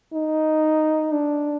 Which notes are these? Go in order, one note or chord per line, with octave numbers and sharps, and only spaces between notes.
D#4
D4